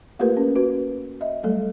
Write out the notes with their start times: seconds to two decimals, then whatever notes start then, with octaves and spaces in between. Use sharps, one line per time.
0.19 A3 A#3 F4 G4 A#4 B4
0.37 C#4
0.56 F#4 B4
1.21 D#5 E5
1.43 F#3 G3 A3 A4